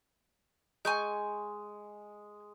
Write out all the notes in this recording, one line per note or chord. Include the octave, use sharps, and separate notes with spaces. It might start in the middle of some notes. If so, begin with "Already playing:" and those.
G#3 G#5 C#6 G6